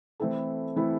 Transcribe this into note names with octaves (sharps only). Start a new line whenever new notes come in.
E3 A3 C4 E4 A4
E3 A3 C4 E4 A4